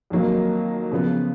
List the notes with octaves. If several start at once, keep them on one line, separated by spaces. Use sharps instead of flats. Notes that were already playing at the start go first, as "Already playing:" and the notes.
F2 D#3 F#3 A#3 D#4
C#3 F3 B3